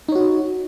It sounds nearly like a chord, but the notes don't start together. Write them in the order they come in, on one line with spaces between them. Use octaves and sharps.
D#4 C#5 F#4